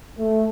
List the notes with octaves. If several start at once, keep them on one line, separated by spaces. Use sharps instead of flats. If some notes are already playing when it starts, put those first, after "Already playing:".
A3